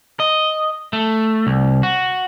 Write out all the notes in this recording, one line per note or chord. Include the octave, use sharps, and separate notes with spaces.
D#5
A3
C2
F#4